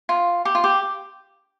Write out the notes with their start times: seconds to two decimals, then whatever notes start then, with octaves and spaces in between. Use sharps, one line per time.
0.09 F4
0.45 G4
0.55 F4
0.64 G4